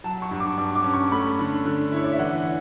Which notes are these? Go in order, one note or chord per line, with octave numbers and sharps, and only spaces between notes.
F#3 A5
C#6
G2
D6
G2 D6
D6
C#4
C#6
A3 B5
D3
D3
E4 C#5
D5
E5
E3 F#5